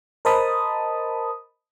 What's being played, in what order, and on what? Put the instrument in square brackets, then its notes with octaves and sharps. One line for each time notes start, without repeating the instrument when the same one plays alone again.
[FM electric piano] A#4 C5 D#5 A5 B5 D#6